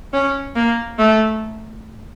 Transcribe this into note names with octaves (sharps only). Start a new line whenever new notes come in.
C#4
A#3
A3